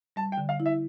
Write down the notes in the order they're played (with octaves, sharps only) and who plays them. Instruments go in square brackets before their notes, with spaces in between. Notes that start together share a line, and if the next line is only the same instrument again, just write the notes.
[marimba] G3 [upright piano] A5
[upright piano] G5
[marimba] D3
[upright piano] F5
[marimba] E4
[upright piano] E5